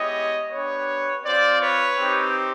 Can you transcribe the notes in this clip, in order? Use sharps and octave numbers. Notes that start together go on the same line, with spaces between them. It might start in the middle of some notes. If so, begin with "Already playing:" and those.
Already playing: G#3 B3 E4 G4 C#5 D#5
B3 D4 G4 B4 C#5
C4 F4 C5 D5
B4 C#5
C4 D#4 G4